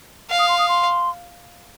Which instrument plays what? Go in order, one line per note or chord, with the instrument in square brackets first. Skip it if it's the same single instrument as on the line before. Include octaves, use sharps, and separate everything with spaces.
[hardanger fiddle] F5
[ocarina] D#6
C6
D#6
C6